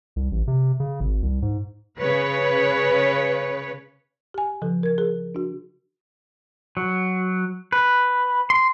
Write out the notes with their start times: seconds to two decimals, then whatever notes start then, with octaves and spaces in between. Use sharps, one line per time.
0.16 C2
0.32 A1
0.47 C3
0.80 C#3
1.00 G#1
1.22 C2
1.42 G#2
2.00 C#3 B4 C#5
4.34 G4 G#5
4.62 C#3 F3 A4
4.83 A#4 G#6
4.98 G#4 A#4
5.35 D4 F#4
6.77 F#3
7.72 B4
8.50 C6